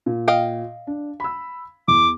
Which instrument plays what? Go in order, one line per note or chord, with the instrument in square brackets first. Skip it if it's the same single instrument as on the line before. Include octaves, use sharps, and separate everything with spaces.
[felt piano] A#2
[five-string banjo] D#5 F5 G5
[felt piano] D4
B5 E6
[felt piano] E2 [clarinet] D6